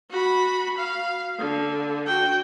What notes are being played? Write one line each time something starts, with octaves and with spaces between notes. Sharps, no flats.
F#4 B5
F5
D3
F#4 G5